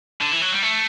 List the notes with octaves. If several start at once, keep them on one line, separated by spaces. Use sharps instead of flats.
D3
E3
F#3
G3
A3